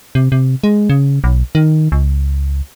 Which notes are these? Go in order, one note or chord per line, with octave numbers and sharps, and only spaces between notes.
C3
C3
G#3
C#3
B1
D#3
C#2